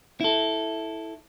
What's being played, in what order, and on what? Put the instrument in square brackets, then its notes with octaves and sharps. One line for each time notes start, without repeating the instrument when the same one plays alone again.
[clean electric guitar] E4 A4